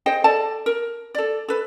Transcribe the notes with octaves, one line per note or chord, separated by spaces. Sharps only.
G#4 C5 D#5 G5
A4 D5 A5
A#4
A4 D5
A4 B4